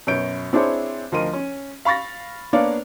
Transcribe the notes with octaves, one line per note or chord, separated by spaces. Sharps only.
F#2 B2 C#5 G6 D7
C4 D4 E4 G#4 C5 C#5
D2 F3 A#4 D#5 C6 D#7
C#4
F5 B5 C#6 A6 A#6
A#3 B3 D4 C#5 D5 F5